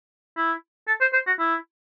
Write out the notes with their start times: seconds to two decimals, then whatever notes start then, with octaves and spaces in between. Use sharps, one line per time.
0.37 E4
0.88 A4
1.01 C5
1.13 C5
1.27 F#4
1.39 E4